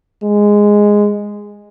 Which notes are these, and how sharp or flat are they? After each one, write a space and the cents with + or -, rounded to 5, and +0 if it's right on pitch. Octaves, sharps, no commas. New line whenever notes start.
G#3 -5